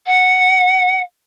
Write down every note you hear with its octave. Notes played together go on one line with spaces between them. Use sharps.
F#5